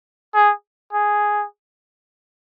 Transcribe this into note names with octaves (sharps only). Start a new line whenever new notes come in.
G#4
G#4